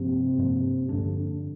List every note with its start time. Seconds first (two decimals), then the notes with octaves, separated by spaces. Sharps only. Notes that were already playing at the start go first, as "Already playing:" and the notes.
Already playing: G2 C3 F3 A#3 D4
0.38 G2 F3 A#3 D4
0.89 G2 D3 F3 A#3 D4